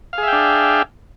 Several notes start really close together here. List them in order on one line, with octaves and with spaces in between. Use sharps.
F5 G#4 E5 G5 D4